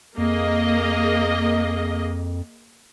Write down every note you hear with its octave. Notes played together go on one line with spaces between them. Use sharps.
F2 A#3 G#4 D#5